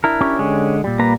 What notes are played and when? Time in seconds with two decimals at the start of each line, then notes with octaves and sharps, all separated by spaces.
0.04 D4 E4 A#4
0.21 C#4 G4 C#5
0.39 D3 G#3
0.84 A#2 G3
0.99 A#3 B4 A#5